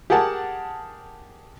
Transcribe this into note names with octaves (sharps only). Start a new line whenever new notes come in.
G4 G#4 A#4 F#5 A5